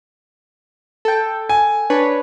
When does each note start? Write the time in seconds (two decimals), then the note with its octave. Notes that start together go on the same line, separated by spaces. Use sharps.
1.05 A4 G5
1.49 G#5
1.90 D4 B4 C#5